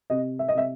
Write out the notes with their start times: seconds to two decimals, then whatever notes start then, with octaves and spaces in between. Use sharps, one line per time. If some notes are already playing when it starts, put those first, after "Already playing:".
0.10 C3 D#5
0.39 E5
0.49 D#5
0.54 C3 E5